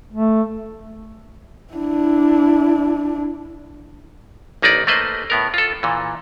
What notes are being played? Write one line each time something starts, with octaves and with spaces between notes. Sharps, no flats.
A3
D4 E4
A1 A#3 D#4 B4 D5
A3 A#3 B4 C5 D#5
A2 B3 A#4
F4 A4
A#2 E3